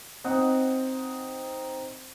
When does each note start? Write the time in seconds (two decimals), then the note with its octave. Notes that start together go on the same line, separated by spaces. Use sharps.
0.24 C4 D#4 F#5 D#6 F#6